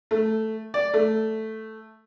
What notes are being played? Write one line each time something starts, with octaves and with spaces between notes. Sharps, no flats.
A3
D5
A3